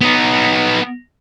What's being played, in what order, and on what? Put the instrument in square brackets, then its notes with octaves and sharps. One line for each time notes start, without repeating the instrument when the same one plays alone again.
[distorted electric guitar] B3 D#4